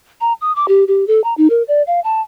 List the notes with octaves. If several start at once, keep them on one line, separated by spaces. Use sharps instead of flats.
A#5
D#6
D6
G4
G4
A4
A#5
D#4
A#4
D5
F5
A5